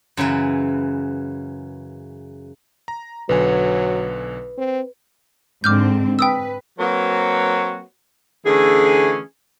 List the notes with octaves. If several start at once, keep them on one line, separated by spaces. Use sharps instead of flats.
F#2 C#3 E3 B4
A#5
B1 D3 F#3 B4 G#5
C4
G#2 D3 C4 D6 F6 G6
B4 G5 D#6 E6
F#3 A#3 C4 F#4 B4 C#5
D3 E3 A3 C#4 G#4